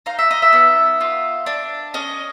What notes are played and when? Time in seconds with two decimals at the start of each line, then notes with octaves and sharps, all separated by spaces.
0.06 D#4 F5
0.19 E5
0.31 D#5
0.42 E5
0.53 B3
1.01 F4
1.46 D4
1.94 C#4 D#5